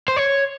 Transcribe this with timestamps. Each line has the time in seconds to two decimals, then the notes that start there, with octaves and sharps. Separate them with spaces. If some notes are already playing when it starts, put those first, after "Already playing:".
0.08 C5
0.17 C#5